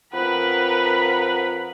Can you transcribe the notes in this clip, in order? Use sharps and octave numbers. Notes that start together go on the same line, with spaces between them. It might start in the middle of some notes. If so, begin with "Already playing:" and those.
F2 A#4 B4 F#5 B5